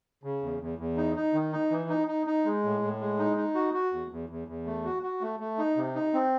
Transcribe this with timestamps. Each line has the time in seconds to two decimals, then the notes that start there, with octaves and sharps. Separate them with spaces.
0.24 C#3
0.42 E2
0.61 E2
0.78 E2
0.97 D#4
1.16 D#4
1.34 D#3
1.53 D#4
1.71 E3
1.89 D#4
2.08 D#4
2.27 D#4
2.45 G#3
2.63 A2
2.82 A2
3.00 G#3
3.19 D#4
3.37 D#4
3.55 F#4
3.74 F#4
3.92 E2
4.11 E2
4.29 E2
4.48 E2
4.66 A3
4.84 F#4
5.03 F#4
5.21 A3
5.40 A3
5.58 D#4
5.77 C3
5.95 D#4
6.14 C4